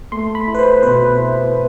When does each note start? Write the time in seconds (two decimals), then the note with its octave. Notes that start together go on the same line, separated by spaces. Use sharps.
0.12 A3 C6
0.35 B5
0.47 E4
0.55 B4
0.59 C5
0.82 B2 B4
1.17 E4
1.53 B4